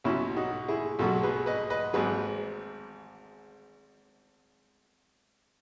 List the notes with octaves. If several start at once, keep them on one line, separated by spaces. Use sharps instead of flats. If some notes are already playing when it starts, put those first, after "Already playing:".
B1 B2 F#3 C#4 E4
D#4 F#4
E4 G#4
B1 B2 F#3 F#4 A4
G#4 B4
B4 D#5
B4 D#5
G#1 G#2 F#3 G#4 B4